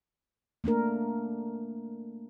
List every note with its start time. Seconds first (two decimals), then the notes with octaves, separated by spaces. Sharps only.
0.64 A3 A#3 D4 A#4